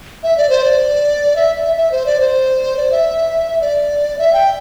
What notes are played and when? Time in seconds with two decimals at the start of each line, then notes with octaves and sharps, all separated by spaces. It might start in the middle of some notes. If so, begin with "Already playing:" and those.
0.23 E5
0.38 D5
0.50 C5
0.64 D5
1.36 E5
1.63 E5
1.77 E5
1.92 C5
2.06 D5
2.21 C5
2.77 D5
2.92 E5
3.61 D5
4.19 E5
4.33 G5